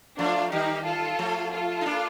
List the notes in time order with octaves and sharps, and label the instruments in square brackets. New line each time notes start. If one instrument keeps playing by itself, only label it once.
[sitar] F3 A3 [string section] D4 F4
[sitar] D#3 G3 [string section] D#4 G4
[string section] F4 A4
[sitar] F3 A3
[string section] F4 A4
[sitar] D#4
A#3 D4